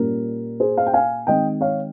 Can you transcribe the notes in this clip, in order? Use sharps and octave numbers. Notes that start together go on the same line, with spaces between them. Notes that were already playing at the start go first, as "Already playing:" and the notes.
Already playing: A#2 G3 C#4 A#4
G#4 C5
F5
G5
F5 G#5
D#3 G#3 C4 D#5 G5
C#5 F5